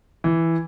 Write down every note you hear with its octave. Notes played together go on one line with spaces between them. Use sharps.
E3